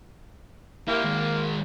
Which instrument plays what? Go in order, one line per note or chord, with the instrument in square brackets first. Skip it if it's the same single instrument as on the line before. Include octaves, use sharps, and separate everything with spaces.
[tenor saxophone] A#3 [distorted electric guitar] E4 G4 [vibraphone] A#4
[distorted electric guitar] D#3 G#3